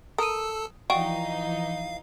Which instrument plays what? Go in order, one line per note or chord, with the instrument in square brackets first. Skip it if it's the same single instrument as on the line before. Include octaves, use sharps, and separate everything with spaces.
[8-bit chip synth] A4 A5 E6 [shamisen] A#4 [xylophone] D#6 D#7
[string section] E3 F3 D#4 [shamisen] F#4 [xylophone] D5 G5 C#6 [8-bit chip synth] F5